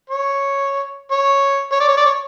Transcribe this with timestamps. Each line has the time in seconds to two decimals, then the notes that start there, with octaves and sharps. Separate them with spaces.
0.10 C#5
1.11 C#5
1.72 C#5
1.80 D5
1.88 C#5
1.97 D5
2.05 C#5